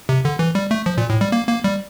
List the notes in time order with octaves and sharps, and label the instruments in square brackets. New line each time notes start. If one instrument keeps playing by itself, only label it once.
[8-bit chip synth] C3
D3
E3
G3
A3
F3
A#2
A2
G3
A#3
A#3
G3